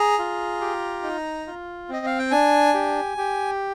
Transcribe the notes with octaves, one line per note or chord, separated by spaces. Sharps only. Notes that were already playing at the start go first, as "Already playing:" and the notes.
Already playing: G#4 A#5
F4
G4
D#4
F4
C4 D#5
F5
G5
D4 G#5
G4
G4